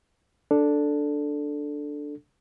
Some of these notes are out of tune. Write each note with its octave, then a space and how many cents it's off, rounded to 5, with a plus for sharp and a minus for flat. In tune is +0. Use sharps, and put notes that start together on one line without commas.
D4 +0 A4 +0